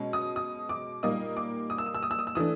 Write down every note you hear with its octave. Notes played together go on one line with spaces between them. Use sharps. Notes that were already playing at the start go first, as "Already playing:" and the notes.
Already playing: B2 G#3 C#4
D#6
D#6
D6
A#2 G3 A#3 D#4 D#6
D6
D#6
E6
D#6
E6
D#6
E6
D#6
E6
E3 A3 D4 D#6